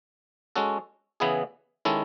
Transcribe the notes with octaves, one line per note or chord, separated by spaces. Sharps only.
G#3 C#4 F#4 A4
C#3 E3 B3 E4 G#4
D#3 G#3 C#4 E4 A4